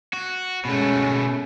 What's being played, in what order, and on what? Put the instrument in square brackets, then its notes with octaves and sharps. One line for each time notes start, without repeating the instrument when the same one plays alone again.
[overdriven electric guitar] F#4
[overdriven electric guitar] B2 A3 [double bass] G#3 C#4